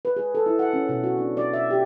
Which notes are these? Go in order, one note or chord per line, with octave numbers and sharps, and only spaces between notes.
B4
G#4
A4
E4
F#5
C#4
B2
F#4
D4
D5
E5
G4